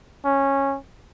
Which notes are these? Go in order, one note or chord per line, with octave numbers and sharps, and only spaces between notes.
C#4